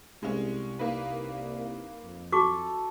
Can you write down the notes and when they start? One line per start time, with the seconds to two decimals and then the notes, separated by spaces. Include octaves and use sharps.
0.23 C2 G#3 C#4
0.79 A#3 D#4 B4
2.02 F2
2.32 F#4 A4 C#6 D6